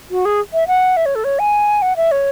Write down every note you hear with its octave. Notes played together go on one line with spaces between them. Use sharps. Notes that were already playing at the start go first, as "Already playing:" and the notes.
F#4
G#4
E5
F#5
E5
C#5
A4
C#5
G#5
F#5
E5
C#5